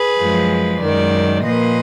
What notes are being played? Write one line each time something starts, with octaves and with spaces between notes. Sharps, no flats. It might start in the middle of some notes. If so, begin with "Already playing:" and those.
Already playing: G#4 B4
F#2 F3 G#3
F#2 D#3 G#3 A#4 D5
A#2 F3 A#3 B4 D#5